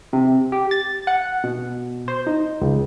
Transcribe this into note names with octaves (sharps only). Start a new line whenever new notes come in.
C3
G4
A6
F#5
B2
C5
D#4
C#2